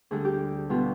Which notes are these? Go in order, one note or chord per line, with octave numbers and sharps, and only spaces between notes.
D2 D3 G3 G#4
G4
B2 G3 F4